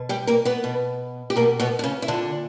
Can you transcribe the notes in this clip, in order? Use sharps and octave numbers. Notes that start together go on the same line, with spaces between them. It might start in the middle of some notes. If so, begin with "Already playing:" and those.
Already playing: B2
G3 G4
A#3 A#4
B3 B4
B2
G4
B2 A#3 A#4
B2 B3
D4
C#3 C#4
E4
A#2 D3 D4